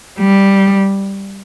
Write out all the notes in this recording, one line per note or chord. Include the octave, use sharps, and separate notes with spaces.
G3